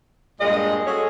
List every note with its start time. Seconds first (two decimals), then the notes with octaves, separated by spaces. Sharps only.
0.40 G2 A#2 G#3 D#5
0.86 C#4 F#4 G#4 A4 C#5